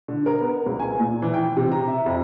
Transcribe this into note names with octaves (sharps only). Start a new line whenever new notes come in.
D3
A#4
B3
C#2
G#5
A#2
E3
G5
C3
A#5
E5
F2